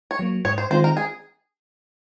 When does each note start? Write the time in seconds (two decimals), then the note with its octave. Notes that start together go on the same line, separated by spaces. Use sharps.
0.11 C#5
0.19 F#3 A#3
0.45 G#2 C#5
0.58 C5
0.71 D#3 G#3 C4 F4 C5
0.84 A#4
0.97 G#4